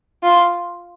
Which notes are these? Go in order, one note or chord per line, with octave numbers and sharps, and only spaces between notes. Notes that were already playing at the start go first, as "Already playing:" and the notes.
F4